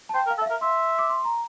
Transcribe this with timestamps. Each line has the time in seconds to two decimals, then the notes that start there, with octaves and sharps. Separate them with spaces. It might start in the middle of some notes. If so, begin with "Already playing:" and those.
0.09 A5
0.14 C5 G5
0.27 A#4
0.31 F5
0.38 A4
0.41 E5
0.46 A#4 F5
0.61 E5 C6
0.99 D6
1.09 C6
1.25 A#5